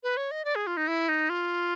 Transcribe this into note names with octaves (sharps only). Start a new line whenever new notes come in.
B4
C#5
D#5
D5
G#4
F4
D#4
E4
D#4
F4